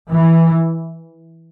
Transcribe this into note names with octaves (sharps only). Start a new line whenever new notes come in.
E3